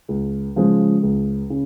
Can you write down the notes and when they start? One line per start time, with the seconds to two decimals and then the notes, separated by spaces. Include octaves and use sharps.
0.09 C#2
0.56 C#3 F3 G#3
1.03 C#2
1.50 C#3